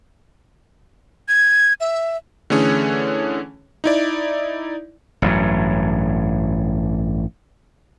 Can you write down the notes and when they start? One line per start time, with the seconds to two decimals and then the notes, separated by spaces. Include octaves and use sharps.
1.28 G#6
1.81 E5
2.50 D3 E3 A3 C#4 G#4 C#5
3.84 D#4 E4 D5
5.22 A1 G2 F#3